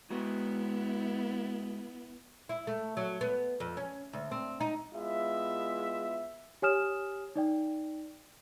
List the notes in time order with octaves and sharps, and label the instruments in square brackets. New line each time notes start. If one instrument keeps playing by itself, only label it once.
[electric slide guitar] G#3 F#4 [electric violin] B3 E4
[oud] E4
A3
F#3
B3
F2
C#4
D2
C4
D#4
[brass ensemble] G#3 B3 E4 F4 E5
[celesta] G4 C#5 G#5 D#6 F6 E7
D#4 D5 G5